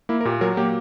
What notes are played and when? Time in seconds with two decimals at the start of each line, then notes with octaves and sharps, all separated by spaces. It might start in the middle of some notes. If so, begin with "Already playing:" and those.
0.09 A#3 E4
0.21 A#4
0.25 A#2 G4
0.41 F#3 A#4
0.57 A#3 G4